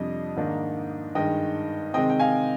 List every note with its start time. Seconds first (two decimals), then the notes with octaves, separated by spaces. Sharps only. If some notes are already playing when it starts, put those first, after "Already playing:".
Already playing: F2 C3 G3 D4 D#5
0.36 G#2 D#3 A#3 D4
1.15 G2 D#3 G#3 D#5 G5
1.94 C3 D#3 G#3 C4 D#5 G5
2.10 G5
2.19 F5 G#5